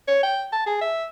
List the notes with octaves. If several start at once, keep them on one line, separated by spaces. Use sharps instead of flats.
C#5
G5
A5
G#4
E5